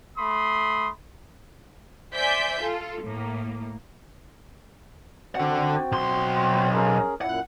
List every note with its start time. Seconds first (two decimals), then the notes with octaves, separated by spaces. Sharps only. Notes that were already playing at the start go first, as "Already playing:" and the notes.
0.17 A3 B5 C6 D#6
2.14 C5 D5 E5 G#5 G6 B6
2.60 F4 A4
3.02 A2 A#3
5.35 D3 C4 F#4 F#5 G5
5.92 B1 C6
6.74 C#4 G#4 A#4
7.21 F#2 A#2 E4 F#5